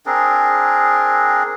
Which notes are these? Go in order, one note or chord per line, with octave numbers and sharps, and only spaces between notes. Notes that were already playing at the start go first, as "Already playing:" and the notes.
C4 D4 G#4 A#4